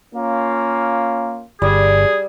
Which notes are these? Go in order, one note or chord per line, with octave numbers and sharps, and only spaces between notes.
A#3 C#4 F4
G1 G3 G#4